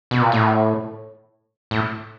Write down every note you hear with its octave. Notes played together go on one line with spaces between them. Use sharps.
B2
A#2
A2
A2